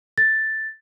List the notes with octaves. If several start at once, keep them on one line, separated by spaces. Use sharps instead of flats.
A6